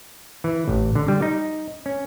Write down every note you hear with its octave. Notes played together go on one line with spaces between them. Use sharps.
E3
A1
D3
G3
D#4
C#4